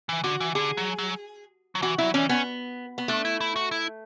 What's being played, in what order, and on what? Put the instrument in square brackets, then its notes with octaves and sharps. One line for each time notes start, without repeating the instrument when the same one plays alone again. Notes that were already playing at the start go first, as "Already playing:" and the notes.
[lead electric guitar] E3
[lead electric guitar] D3 [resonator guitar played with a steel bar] F#4
[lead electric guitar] E3
[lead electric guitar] D3 [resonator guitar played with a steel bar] G#4
[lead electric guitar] F#3
F#3
F#3
[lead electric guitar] E3 [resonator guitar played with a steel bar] F#4
[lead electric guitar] F#3 [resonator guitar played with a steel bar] E4
[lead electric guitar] E3 [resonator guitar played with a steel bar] C#4
[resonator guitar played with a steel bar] B3 [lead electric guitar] C#4
[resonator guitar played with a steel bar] B3
[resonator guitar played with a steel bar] A3 [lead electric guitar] D4
[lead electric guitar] E4
E4
F#4
E4